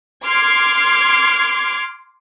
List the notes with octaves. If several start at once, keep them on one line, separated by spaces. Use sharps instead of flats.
C6 D6 F6 G#6 C7